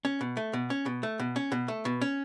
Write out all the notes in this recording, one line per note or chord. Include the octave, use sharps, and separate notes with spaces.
C#4
B2
A3
B2
C#4
B2
A3
B2
C#4
B2
A3
B2
C#4